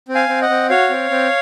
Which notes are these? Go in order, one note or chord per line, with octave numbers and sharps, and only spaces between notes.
C4
F5 G#5
C4
D#5 F#5
C4
F#4 C#5 F5
C4
C4